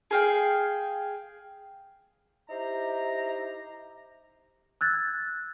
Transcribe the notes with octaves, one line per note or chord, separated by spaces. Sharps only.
G#4 F5 G5
D#4 E4 G4 C5 A#5
E6 F#6 G#6 A6